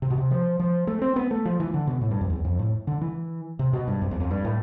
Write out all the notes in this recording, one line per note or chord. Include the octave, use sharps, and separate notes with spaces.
C3
B2
C3
F3
F3
A3
C4
B3
A3
F3
E3
D3
B2
A2
G2
F2
E2
F2
A2
D3
E3
C3
B2
G2
F2
E2
F2
G2
A2